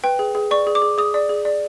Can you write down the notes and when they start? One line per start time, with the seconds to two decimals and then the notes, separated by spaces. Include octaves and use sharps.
0.04 B4 G5
0.19 G#4
0.35 G#4
0.51 D5 C#6
0.67 G#4
0.75 D6
0.82 G#4
0.98 G#4 D#6
1.14 D5
1.29 G#4
1.45 D5